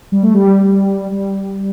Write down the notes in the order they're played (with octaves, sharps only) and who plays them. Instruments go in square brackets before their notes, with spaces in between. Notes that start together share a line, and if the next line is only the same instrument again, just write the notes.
[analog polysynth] G3
A3
G3
G3